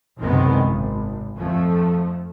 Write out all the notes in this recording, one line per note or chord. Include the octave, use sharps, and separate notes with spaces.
F#1 C2 C3 D#3 G#3 B3
G#1
F2 F3 A3